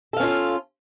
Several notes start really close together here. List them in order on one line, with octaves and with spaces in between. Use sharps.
A4 F5 C#4 F4